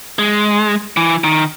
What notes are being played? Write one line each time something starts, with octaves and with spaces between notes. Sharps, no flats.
G#3
E3
D#3